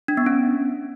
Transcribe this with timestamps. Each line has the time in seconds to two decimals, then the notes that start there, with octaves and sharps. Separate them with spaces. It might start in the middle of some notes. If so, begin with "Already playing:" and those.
0.08 D4
0.17 B3
0.26 C#4